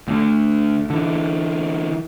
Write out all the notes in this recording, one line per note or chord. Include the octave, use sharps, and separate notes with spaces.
D2 D3
D3 E3